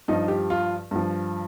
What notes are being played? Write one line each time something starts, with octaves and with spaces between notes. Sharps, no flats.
G2 F3 D#4
G4
F4
G2 F3